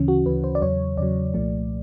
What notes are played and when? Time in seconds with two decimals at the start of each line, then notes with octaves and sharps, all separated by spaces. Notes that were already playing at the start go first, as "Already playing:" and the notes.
Already playing: D2 C#3 E3 C#4
0.08 F#4
0.25 D2 C#3 E3 B4
0.44 C5
0.55 D5
0.62 E2 C#3 F#3 C#5
0.97 E2 C#3 F#3 D5
1.34 C2 A#2 F3 A3